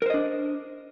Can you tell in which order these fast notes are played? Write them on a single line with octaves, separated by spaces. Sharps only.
A#4 C5 D#5 D4